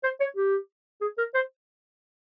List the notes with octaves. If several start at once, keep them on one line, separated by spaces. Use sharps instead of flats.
C5
C#5
G4
G#4
A#4
C5